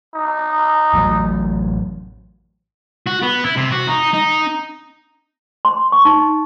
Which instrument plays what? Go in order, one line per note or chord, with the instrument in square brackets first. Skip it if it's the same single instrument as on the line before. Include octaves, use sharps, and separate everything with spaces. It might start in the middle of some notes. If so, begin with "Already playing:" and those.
[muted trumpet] D#4
[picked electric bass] A1 A2 F#3
[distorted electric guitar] F#4
B3
E4
C3
F#4
D#4
D#4
[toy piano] C6
C#6
D#4